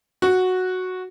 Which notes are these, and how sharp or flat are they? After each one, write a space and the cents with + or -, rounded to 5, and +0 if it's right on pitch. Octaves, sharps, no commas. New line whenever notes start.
F#4 -5